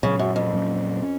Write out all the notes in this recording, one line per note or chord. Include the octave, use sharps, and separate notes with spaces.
A#2 C#3 F#3 C#4
F#2
F2
A#2 F#3 C#4
C#4